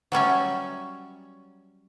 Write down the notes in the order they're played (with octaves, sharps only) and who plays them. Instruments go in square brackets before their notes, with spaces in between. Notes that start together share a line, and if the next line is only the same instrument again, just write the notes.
[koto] F#3 G3 C#4 E5